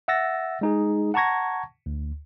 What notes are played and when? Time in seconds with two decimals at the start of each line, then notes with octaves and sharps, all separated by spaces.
0.08 E5 F#5 E6 A6 A#6
0.61 G#3 D#4 G#4
1.14 F#5 A5 A#5 C#6 G#6 A#6
1.86 D2